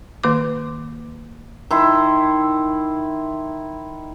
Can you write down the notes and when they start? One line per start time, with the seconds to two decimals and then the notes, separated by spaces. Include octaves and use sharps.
0.23 D#3 A#3 D6
1.71 D#3 E4 C6